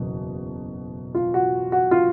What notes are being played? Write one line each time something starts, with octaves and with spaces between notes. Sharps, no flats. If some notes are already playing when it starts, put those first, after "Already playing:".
Already playing: F#1 E2 B2
F4
F#4
F#4
F4